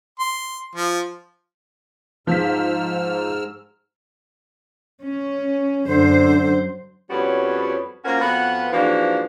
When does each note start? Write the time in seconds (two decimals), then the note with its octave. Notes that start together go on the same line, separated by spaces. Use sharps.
0.19 C6
0.75 F3
2.27 G#2 F3 E6 F6 B6
5.04 C#4
5.87 F#2 D3 C5
7.11 F2 G3 B3 C#4 F#4 C#5
8.05 A#3 C#4 F4 F#4 A#4 C5
8.22 F2 B3 F4 F#4 B4 F#5
8.73 G#2 E3 F3 A#3 D4 F#4